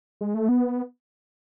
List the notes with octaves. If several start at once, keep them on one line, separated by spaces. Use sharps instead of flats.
G#3
A3
B3